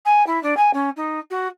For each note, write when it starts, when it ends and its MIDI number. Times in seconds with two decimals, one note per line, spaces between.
0.05 0.25 80
0.26 0.41 64
0.43 0.56 62
0.56 0.70 80
0.73 0.89 61
0.96 1.19 63
1.30 1.47 66